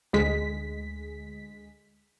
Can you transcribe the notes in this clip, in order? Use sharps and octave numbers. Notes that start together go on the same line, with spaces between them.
D2 G#3 B6